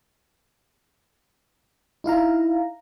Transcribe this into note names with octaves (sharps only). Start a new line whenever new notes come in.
D#4 E4 F5 A#5